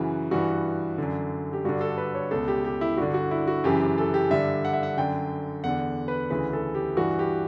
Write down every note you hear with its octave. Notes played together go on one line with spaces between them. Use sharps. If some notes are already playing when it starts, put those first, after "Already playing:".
Already playing: F#2 C#3 E3 F#4
G2 E3 F#4
F#2 D3
G4
G2 D3 F#4
A4
B4
C#5
C#2 B2 A4
G4
G4
E4
G2 D3 F#4
F#4
E4
F#4
F#2 C#3 E3 G4
G4
A4
G4
G2 D3 E5
F#5
E5
F#5
F#2 D3 G5
E2 D3 F#5
B4
D2 C#3 E3 B4
A4
G4
G2 E3 F#4
G4